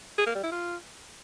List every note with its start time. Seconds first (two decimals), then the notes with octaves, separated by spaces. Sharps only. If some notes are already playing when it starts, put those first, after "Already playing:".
0.18 G#4
0.26 A#3
0.35 G3
0.43 E4
0.52 F4